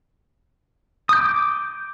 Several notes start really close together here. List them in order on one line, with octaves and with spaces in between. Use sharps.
D#6 G6 D6